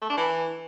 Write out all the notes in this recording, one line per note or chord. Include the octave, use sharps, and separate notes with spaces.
A3
D4
E3